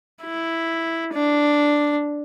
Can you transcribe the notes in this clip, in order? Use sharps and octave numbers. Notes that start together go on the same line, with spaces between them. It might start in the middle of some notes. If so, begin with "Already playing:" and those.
E4
D4